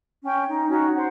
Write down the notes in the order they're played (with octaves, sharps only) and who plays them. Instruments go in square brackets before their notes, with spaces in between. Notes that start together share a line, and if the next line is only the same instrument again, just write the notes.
[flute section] C#4 G5
D#4
C#4 D#4 F#4 D#5
C5 F#5